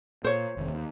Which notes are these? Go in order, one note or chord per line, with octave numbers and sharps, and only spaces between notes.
A#2 C5 C#5
F1 D#3
D#2